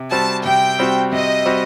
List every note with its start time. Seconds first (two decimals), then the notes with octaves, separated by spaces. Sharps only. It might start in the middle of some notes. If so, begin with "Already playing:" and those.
Already playing: C3
0.11 G3 C4 F#4 A5
0.45 C3 G5
0.79 G3 C4 F#4
1.12 C3 D#5
1.46 G3 C4 F#4